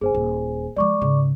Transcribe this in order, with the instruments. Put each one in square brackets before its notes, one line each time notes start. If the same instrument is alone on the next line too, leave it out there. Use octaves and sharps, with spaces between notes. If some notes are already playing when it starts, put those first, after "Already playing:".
[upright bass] G1 [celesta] G#4 C5 G#5
[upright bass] D#1
[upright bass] F3 G#3 [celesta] D5 C#6 D6
[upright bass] G#2 C#3